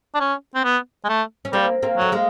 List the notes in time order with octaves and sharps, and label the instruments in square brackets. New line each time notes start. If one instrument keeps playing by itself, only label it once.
[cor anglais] D4
C#4
C4
B3
G#3
A3
[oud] C#4
[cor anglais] G3 [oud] A#3 C4
[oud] A#3 C4
[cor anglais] F#3 [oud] A3
[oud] G#3 A#3